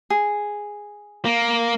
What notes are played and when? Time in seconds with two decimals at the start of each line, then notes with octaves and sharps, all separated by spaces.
0.10 G#4
1.25 A#3